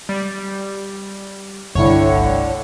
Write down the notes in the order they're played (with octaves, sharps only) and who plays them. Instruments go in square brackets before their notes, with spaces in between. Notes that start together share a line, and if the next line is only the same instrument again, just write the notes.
[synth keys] G3
[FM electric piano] G1 C2 E4 [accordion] A2 D3 [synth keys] C#5